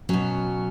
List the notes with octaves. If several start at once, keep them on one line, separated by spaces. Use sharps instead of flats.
B2 F#3 C#4